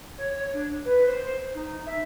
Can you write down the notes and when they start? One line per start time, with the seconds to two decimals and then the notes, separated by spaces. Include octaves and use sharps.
0.18 C#5
0.33 C#5
0.53 D4
0.85 B4
1.06 C5
1.54 D#4
1.86 E5